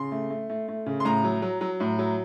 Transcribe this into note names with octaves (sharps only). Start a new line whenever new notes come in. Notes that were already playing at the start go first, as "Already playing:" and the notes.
Already playing: C#3 C6
A3
A3
A3
A3
C#3
C6
A2 A#5
F#3
F#3
F#3
A2
F#3